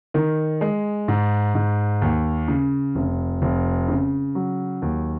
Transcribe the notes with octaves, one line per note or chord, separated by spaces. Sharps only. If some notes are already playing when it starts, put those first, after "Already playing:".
D#3
G#3
G#2
G#2
D#2
C#3
F1
F1
C#3
F#3
D#2